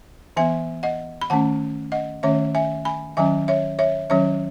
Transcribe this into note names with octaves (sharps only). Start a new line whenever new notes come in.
E3 B3 E5 G#5
D#5 F#5
B5
D#3 A3 C#4 F#5 A5
D#5 F#5
D#3 A3 C#4 C#5 E5
E5 G#5
G#5 B5
D#3 F#3 C#4 E5 G#5
C#5 E5
C#5 E5
D#3 F#3 C#4 C#5 E5